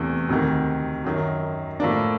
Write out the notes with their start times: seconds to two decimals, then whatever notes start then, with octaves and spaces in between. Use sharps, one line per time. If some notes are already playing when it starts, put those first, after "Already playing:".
Already playing: E2 C3 E3 A3
0.29 D2 C3 D#3
1.04 F#2 D#3 F#3
1.80 A2 F3 A#3 D4